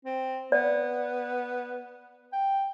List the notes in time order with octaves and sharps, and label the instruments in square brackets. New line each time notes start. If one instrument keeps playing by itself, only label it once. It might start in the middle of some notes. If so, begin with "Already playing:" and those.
[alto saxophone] C4
[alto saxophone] B3 [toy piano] D5
[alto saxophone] G5